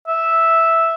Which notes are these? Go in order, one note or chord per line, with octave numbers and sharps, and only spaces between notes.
E5